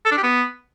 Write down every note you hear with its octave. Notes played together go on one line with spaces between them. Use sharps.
A4
D4
G4
B3